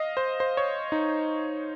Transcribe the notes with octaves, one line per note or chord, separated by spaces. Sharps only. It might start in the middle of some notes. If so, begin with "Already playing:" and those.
Already playing: D#5 F5
C5
C5
C#5
D#4